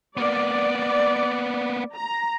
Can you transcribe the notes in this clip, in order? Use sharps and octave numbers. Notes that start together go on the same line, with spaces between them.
A#3 B3 D5
A#5